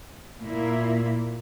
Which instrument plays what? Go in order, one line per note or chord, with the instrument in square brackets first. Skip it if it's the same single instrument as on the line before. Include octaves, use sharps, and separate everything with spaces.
[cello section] A#2 A#3 E4